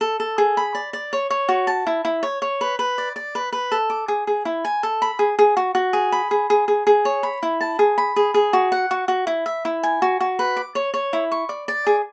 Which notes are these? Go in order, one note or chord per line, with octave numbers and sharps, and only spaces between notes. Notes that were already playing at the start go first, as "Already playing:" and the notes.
A4
A4
G#4
B5
D5
D5
C#5
C#5
F#4
A5
E4
E4
C#5
C#5
B4
B4
D5
D5
B4
B4
A4
D6
G#4
G#4
E4
G#5
A4
B5
G#4
G#4
F#4
F#4
G#4
B5
G#4
G#4
G#4
G#4
C#5
B5
E4
A5
G#4
B5
G#4
G#4
F#4
F#5
F#4
F#4
E4
E5
E4
G#5
F#4
F#4
B4
D6
C#5
C#5
E4
C#6
D5
D5
G#4